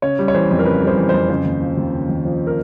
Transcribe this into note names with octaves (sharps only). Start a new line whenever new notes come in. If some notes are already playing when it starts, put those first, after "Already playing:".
C#3 C#5
G3
C#5
E3 C5
F2
A#4
C#3 B4
G3
C5
E3
F2 C5
C#3 C5
D#2
F3
D#2
C#3
D#2
F3
A#4